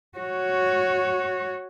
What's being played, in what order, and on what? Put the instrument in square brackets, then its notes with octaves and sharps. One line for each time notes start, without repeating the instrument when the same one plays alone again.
[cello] F#4 C#5